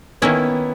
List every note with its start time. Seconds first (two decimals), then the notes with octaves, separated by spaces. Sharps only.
0.22 D#3 A#3 B3 C#4 E4